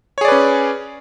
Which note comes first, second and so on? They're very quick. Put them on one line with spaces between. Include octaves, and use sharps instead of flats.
C#5 G#4 D5 B4 C#4